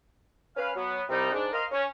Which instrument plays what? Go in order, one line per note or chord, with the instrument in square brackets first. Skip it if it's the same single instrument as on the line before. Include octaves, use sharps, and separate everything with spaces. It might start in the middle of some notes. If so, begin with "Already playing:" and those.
[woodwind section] C#4 B4 F5
F#3 B3
C2 C3 G3 D#4
G#2 D4
A#4 C5 D#5 F5
C#4